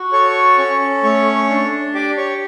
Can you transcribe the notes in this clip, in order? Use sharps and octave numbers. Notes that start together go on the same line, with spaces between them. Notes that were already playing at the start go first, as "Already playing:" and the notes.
Already playing: F#4
A4 C#5 C#6
C#4
A3 C#5 C#6
D4
G4 D5 D6
C#5 C#6